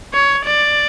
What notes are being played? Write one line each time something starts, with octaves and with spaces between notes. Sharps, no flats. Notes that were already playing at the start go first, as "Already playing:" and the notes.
C#5
D5